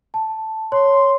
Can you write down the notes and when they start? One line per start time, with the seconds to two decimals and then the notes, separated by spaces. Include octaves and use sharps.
0.14 A5
0.72 C#5 C6